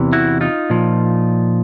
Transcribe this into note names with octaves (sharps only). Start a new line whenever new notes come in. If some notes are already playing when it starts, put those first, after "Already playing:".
Already playing: E2 C3 E3
E4 F#4
D#4 F4
A#2 F3